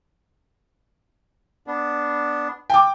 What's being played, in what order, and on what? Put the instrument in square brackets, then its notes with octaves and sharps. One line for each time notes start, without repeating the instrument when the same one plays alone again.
[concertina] B3 D4
[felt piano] G5 D6